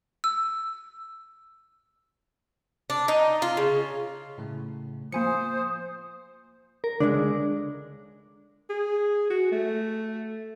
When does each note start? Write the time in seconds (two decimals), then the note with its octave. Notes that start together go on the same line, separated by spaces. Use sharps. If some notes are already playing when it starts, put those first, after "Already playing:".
0.24 E6
2.90 D4
3.08 D#4
3.42 F4
3.57 C#3
4.38 A2 C#3 A3
5.12 F3 A#3 F4 C5 G#5 D#6 C#7
6.84 A#4
7.00 C#2 D3 G#3 D4
8.70 G#4
9.30 F#4
9.52 A3